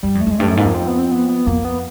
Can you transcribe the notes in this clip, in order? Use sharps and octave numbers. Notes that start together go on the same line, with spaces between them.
G2 G3
F2
A3
F2 G#3
G2 A3
F#2
G#2 A#3
F2
C4
B3
C4
B3
B3
F2 A#3
B3